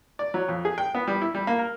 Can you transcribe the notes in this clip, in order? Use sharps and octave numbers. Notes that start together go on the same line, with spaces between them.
D5
F#3
F2
G#4
G5
B3
G3
E4
G3
A#3
A#4